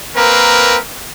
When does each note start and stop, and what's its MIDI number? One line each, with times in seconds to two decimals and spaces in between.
0.16 0.77 58
0.16 0.77 60
0.16 0.77 70
0.16 0.77 71